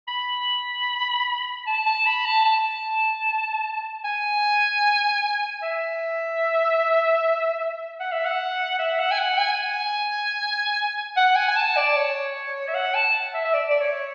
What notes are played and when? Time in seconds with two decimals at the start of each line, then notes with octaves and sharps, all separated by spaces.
0.08 B5
1.67 A5
1.86 A5
2.06 B5
2.26 A5
2.45 A5
4.04 G#5
5.63 E5
8.00 F#5
8.12 E5
8.25 F#5
8.79 E5
8.99 F#5
9.11 G#5
9.19 F#5
9.38 G#5
11.17 F#5
11.36 G#5
11.48 G#5
11.56 A5
11.77 D5
11.96 C#5
12.68 E5
12.75 F#5
12.95 A5
13.34 E5
13.45 E5
13.54 D5
13.71 D5
13.81 C#5